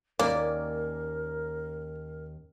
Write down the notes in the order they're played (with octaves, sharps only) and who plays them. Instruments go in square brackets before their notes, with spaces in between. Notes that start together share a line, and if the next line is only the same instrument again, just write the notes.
[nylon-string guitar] D#2 C#4 [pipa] A#3 [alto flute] A#4 [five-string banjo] D5